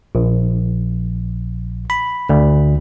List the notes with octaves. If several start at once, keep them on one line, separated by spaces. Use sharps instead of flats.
A#1
B5
D2